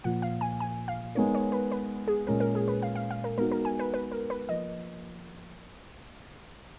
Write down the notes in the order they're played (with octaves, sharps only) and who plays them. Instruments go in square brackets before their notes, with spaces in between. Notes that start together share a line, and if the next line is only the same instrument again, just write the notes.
[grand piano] A#2 F3 A#3 [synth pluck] F#5
[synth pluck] F5
G#5
G#5
F5
[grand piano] G#3 B3 D#4 A#4 [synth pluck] C#5
[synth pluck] C#5
B4
B4
G#4
[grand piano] A#2 G#3 C#4 [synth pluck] A#4
[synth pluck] A#4
G#4
B4
F5
F5
F5
A#4
[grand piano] G#3 B3 D#4 F#4 [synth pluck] A#4
[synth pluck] A#4
G#5
B4
B4
A#4
B4
[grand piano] F3 A#3 [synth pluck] D#5